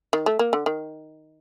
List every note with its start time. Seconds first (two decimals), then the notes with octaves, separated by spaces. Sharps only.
0.13 D#3
0.26 A3
0.39 A#3
0.53 D3
0.66 D#3